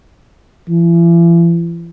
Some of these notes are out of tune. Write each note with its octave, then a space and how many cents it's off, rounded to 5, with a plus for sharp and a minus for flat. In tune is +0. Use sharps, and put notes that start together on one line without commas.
E3 +40